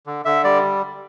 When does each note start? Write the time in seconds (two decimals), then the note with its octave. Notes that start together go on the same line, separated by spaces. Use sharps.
0.06 D3
0.25 D3 E5
0.44 G3 D5